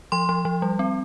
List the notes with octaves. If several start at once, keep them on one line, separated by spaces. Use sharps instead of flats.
F3 C6
F3
F3
G3
C4